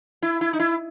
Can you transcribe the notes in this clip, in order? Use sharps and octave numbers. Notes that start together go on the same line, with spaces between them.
E4
E4
D#4
E4